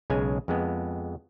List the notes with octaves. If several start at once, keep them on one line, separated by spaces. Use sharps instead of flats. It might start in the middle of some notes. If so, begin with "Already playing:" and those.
B1 C#3 G#3 G#5
F2 G#3 B3